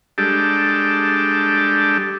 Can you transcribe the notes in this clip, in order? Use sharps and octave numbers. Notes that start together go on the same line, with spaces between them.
G3 G#3 D4 G4 A4